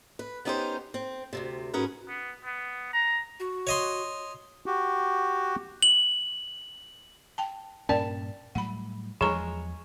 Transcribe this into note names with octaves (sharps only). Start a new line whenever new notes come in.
B4
B3 C#4 D#4 G4 A4 C5
C4
D2 G#2 C3
G#2 F#3 C#4 G#4 A#4 B4
B3
B3
A#5
F#4
C#5 D#5 C6
F#4 G4
F#7
G5 A5
G2 A#2 C#4 A#4 D5 G5 A5
A2 F#3 G3 F#5 B5
E2 F3 F#3 G#3 G#4 C#5 A#5